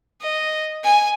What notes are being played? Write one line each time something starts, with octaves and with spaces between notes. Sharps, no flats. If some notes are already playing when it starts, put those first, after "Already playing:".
D#5
G#5